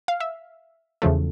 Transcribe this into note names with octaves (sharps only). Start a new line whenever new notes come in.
F5
E5
E2 C#3 F3 A3